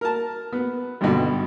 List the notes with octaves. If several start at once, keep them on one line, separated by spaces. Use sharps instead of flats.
A#4 A5
B3
G#1 G2 B2 D3